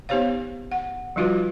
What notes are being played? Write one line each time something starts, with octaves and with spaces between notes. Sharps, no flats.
B3 D#4 G4 C5 C#5 F5
F#5
F3 G3 D#4 F4 F#4 B4